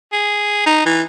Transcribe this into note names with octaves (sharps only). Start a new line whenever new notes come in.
G#4
D#4
E3